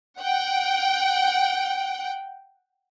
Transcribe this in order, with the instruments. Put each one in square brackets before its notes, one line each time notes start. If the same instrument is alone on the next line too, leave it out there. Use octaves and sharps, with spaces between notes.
[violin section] F#5 G5